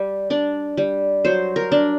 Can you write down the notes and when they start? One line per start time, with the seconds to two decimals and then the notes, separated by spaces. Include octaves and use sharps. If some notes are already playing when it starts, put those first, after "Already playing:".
Already playing: G3
0.30 D4 D5
0.77 G3
1.25 F#3 C5
1.56 A#4
1.72 D4